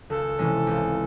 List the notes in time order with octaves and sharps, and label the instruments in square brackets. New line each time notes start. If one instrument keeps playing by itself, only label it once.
[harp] C#2 [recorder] A4
[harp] C3 E3 G#3 C#4
C#2